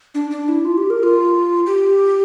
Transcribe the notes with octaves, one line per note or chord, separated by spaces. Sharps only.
D4
D4
E4
F4
G4
A#4
F4
G4